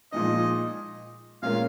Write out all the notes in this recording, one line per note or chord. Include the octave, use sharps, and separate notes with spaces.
A#2 F3 G#3 D#4 D#5
A#2 G#3 C#4 F4 A#4 F5